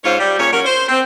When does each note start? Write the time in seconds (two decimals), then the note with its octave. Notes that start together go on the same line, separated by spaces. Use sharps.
0.04 G#2 C#4 F4 C5 C#5
0.19 G3
0.39 A#2 G#4 C#5
0.52 F#3 G3 C#4 A#4
0.64 C5
0.89 C4